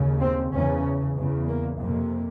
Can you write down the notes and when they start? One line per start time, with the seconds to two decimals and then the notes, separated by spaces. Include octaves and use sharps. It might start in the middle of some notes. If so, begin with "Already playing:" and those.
Already playing: D#2 C#3
0.21 C4
0.53 E2 C#3 C#4
1.17 E2 C#3
1.49 A#3
1.80 F2 C3 A#3